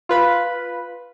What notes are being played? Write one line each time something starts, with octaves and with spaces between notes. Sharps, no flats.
F4 B4 B5